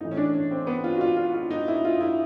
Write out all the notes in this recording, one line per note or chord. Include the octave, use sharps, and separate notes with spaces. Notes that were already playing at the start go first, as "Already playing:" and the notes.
A2 E3 D#4
C#4
D4
C#4
C4
B3
F4
F#4
F4
F4
F4
D#4
E4
F4
E4